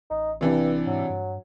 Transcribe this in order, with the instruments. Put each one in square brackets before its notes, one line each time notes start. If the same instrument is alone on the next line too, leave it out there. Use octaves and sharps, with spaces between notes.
[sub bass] A1 [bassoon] D#4
[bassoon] G2 [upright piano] C3 E3 D4
[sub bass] G#2 [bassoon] F#3
[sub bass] G2